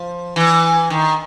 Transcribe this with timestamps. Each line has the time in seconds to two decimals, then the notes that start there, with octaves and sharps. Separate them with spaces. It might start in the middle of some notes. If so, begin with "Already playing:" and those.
Already playing: F3
0.36 E3
0.90 D#3